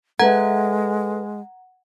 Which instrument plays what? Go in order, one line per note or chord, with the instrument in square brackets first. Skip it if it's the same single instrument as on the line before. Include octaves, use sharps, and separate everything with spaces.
[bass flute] G#3 [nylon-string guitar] A4 B4 E5 [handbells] F#5 A#5 G#6